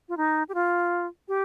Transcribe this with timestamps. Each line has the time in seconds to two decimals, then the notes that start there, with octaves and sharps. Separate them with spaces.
0.09 F4
0.17 D#4
0.49 G4
0.54 F4
1.28 G4